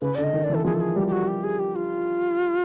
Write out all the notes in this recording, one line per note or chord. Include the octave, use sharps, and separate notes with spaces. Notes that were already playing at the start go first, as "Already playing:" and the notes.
C#3 B4
D3 D5
D#5
D#3
D5
E3
A4
F3 G#4
A4
G#4
G3 G4
G4
F#4
G4
G#4
G4
F4